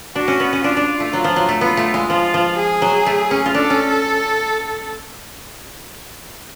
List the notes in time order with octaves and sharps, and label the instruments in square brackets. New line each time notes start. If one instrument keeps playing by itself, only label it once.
[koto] D4 [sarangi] F#4
[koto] C#4
B3
C#4
[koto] D4 [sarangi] F4
[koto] D4
A3
F#3
F3
F#3
A3
[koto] B3 [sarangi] F4
[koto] A3
G#3
[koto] F3 [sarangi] F4
[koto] F3
[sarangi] G#4
[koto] F#3
A3
C#4
F4
[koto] D4 [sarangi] A4
[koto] C#4